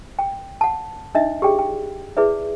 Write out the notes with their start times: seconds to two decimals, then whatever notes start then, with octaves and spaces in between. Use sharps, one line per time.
0.19 G5
0.61 F#5 A5
1.15 D4 D#4 D#5 E5
1.42 G4 G#4 D5 G5
1.59 G5
2.17 E4 G#4 B4 D5 E5